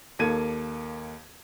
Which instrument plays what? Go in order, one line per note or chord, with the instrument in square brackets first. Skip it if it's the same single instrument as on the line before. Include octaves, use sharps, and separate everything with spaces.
[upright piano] D#2 A#3 A4 G#6 D#7